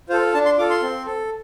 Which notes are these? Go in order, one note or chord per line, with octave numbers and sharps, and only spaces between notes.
F4 A4 C5
D4 A5
C6
F4 A4 D6
C6
C4
A4